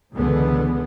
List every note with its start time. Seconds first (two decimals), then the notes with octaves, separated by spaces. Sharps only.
0.13 C#2 B2 D3 E3 G#3 B3